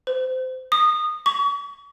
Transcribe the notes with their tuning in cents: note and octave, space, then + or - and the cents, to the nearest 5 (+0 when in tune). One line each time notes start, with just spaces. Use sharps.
C5 -25
D#6 -20
C#6 +40